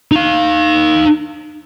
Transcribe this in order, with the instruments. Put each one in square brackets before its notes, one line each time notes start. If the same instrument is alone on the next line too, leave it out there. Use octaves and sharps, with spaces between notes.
[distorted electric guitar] D#4 F5